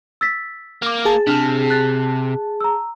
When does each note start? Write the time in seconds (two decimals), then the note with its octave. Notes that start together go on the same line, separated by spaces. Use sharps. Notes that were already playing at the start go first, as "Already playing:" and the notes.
0.21 E6 A6 B6
0.82 A#3 D6 F6
1.05 G#4 A5
1.27 C3 D4 F6
1.70 F#6 A6
2.60 A#5 E6